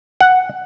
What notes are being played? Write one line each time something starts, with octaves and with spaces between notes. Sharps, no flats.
F#5